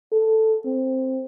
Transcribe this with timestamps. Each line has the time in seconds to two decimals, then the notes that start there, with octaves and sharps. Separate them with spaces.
0.12 A4
0.66 C4